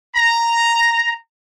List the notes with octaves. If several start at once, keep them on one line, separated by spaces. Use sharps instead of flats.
A#5